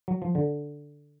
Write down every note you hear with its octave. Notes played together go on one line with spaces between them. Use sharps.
F#3
F3
D3